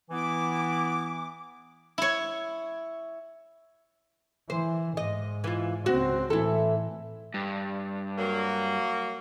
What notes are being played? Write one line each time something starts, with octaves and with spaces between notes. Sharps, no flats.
E3 B3 E4 D6
E4 C#5
E3 C5
G#2 D#5
E3 F4
C#2 C4 F#4
A2 E3 E4 A4
G2
F#3 A#3